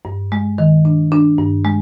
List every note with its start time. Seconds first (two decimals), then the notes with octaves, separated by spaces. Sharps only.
0.05 G2
0.32 G#3
0.58 D#3
0.85 D4
1.12 D4
1.38 G2
1.65 G#3